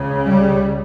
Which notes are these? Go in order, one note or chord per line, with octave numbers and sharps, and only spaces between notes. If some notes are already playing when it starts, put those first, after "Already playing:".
Already playing: C#2 C#3
G3